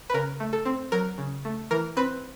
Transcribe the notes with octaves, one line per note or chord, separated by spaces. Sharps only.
B4
C#3 A#4
A3
A4
C4
F#3 A#4
C#3
A3
E3 A#4
C4 B4